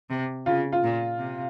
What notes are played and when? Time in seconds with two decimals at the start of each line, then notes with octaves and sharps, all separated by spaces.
0.10 C3
0.46 C#3 F4
0.72 F4
0.84 A#2
1.19 C3